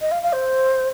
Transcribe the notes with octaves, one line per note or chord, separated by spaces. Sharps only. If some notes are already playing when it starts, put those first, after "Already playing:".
D#5
F5
F5
C5